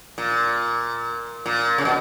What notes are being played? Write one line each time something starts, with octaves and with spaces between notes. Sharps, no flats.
A#2
A#2
C#3
B2